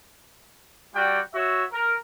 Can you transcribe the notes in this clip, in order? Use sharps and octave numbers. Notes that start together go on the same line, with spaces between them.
G3 F#4 D5 G5
F#4 C#5 E5
A#4